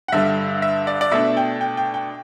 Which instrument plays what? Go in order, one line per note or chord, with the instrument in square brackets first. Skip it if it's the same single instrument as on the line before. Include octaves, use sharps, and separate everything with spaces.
[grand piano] F#5
G2 D3 G3 E5
E5
D5
D5
B2 A3 D4 E5
G5
G5
G5
G5